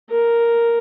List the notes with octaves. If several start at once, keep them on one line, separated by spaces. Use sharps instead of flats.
A#4